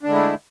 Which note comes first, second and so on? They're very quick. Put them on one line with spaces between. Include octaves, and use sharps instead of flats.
D4 D3 G#3 E4 A3